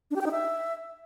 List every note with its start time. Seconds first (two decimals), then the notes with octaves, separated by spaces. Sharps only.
0.11 D4
0.16 G4
0.21 G5
0.26 D#4
0.31 E5